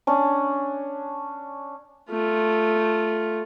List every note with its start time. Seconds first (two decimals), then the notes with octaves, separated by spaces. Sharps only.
0.07 C#4 D4
2.10 A3 F4